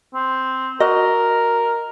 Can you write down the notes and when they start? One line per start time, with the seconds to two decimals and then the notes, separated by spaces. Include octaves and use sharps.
0.15 C4
0.80 F#4 A#4 D#5